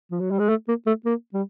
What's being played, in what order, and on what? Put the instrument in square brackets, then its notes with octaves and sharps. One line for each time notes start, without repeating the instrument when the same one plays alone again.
[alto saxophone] F3
F#3
G3
G#3
A3
A#3
A3
A#3
G3